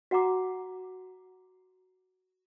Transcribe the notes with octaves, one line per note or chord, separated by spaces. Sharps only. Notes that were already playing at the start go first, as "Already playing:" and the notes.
F#4 F#5 A#5 D6